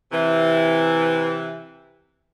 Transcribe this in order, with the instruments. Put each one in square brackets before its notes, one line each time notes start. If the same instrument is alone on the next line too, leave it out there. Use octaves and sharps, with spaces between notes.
[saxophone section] C3 E3